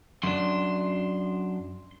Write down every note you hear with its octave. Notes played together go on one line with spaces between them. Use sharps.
F#2 D4 C6